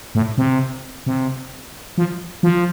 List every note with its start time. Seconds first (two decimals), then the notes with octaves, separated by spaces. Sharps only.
0.15 A2
0.38 C3
1.06 C3
1.98 F3
2.43 F3